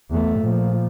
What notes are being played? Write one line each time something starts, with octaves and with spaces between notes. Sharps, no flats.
E2 A3
A#2 F3